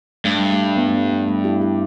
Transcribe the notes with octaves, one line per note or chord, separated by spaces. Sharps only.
G2 A3
G3
A3
G3 B3
A3
G3 B3
A3
A3
E4 G4
E4 G4